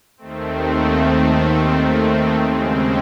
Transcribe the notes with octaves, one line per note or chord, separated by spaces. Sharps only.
D#2 D#3 A3 C4
D#2 C#3 G#3 C4